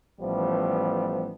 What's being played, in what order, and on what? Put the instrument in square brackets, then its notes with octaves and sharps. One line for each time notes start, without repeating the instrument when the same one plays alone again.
[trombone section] A1 F3 G3 A3 B3